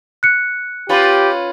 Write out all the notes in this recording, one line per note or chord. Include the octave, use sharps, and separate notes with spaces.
F#6 C#7
C#4 F4 G4 B4